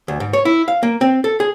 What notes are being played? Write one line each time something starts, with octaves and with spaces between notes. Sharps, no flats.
D2
G#2
C#5
E4
F5
A#3
C4
A4
G#4